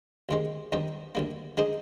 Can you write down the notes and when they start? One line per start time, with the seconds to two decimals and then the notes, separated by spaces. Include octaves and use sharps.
0.29 D2 C3 D#3 G#3 C4
0.72 D#2 D3 G3 C4 D#4
1.15 D2 D3 G3 A#3
1.57 D3 G#3 D#4 G#4 C5